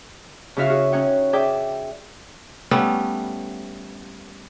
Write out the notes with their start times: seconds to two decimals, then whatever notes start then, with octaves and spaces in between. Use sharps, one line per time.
0.57 C#3 E4 F#4 E5 F5
0.70 F#4 G#4
0.92 C#4 D#4 C#5 F#5 G5
1.33 G#4 D5 E5 G5 D6
2.71 G3 A3 B3 C#4